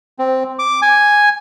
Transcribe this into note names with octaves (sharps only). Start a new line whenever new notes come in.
C4
D6
G#5